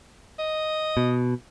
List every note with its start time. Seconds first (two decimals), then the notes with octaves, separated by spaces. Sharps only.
0.39 D#5
0.97 B2